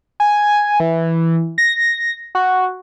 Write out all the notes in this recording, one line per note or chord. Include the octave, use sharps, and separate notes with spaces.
G#5
E3
A#6
F#4